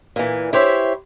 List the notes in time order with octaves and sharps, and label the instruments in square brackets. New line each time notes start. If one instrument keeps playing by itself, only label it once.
[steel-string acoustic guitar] A#2 E3
E4 G4 C5 C#5 E5